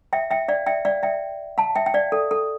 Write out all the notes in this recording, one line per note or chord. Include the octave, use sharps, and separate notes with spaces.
E5 G5
E5 G5
D5 F5
E5 G5
D5 F5
E5 G5
F5 A5
E5 G5
G5
D5 F5
A4
A4